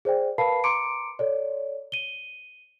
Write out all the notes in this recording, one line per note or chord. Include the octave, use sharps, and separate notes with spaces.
G#4 C5 D5 G5
A#4 B4 F5 A5 B5 C7
A#5 C6 D6 C#7 D7
A4 C#5 D5
D#7 G7